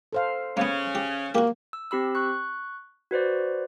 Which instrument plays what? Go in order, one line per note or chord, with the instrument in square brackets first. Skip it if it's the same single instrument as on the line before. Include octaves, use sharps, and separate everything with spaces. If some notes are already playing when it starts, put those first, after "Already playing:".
[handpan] A4 C5 F5
[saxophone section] C#3 C#4 [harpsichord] A#3 B3
[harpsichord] G4
[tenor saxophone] A#3 [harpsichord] F#4 G4
[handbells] E6
C4 G4 B5 E6
C#6 F#6
F#4 B4 C5 D5